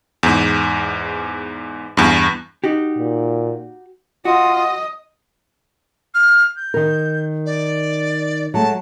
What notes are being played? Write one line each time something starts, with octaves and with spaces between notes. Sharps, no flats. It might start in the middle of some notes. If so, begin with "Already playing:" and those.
E2 G#2
E2 G2
D#4 F#4 G4
A#2
F4 F#4 D#5
F6
G6
D#3 A#4
D5
F#3 G#3 A3 A5